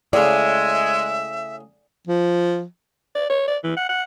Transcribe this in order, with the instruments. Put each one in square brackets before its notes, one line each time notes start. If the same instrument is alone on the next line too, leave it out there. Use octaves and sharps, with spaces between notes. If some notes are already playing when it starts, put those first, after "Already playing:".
[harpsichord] A2 C#3 [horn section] G#3 [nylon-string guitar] D5 [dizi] E5
[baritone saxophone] F3
[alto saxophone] D5
C#5
D5
E3
F#5
F#5